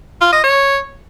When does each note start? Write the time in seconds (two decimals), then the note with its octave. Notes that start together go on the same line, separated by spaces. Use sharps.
0.21 F4
0.33 D#5
0.44 C#5